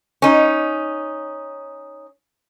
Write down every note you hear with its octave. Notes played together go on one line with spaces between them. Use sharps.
C#4 D#4